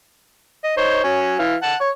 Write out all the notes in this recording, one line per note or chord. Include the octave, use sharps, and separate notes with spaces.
D#5
D#4 C5 C#5
F#3 C#4
E3 F5
F#5 A5
C#5